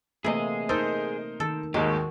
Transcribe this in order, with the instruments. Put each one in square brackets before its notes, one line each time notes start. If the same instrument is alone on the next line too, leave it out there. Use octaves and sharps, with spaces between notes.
[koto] C3 E3 [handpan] A3 A#3 [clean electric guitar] G#4 D#5
[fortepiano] D#4 A#4 C5 [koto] A4
[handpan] D#3 [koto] A4
[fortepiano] D#2 G#2 G#3 [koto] D#3 [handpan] F#4 [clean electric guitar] G4